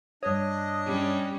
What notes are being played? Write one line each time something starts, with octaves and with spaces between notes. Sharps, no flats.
G2 D4 C#5 D#5 D#6
G3 C#4